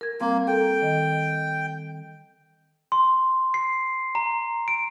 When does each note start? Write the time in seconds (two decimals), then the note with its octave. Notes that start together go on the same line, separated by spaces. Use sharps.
0.01 A#4 G#6
0.21 G3 A#3 C4
0.47 A4 G5
0.82 D#3 D#5
2.92 C6
3.54 C7
4.15 A#5
4.68 D7